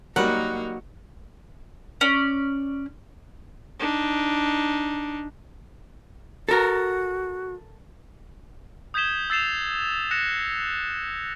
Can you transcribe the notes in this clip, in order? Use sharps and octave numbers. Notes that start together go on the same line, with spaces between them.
F#3 G3 A#3 D#4 A#4 F#5
C#4 D5
D4 D#4
F#4 A4 A#4
D#6 G6 G#6 B6 E7 G7
E6 A6 C7 E7 F7
F#6 A#6 C#7 E7